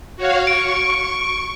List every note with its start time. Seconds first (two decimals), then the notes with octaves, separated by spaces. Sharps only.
0.16 F#4 C#5 F5
0.47 C#6 D7